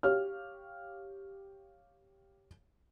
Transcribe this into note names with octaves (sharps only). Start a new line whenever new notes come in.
G4 C#5 F5 F6